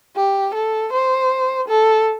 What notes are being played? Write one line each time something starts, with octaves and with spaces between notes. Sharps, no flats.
G4
A4
C5
A4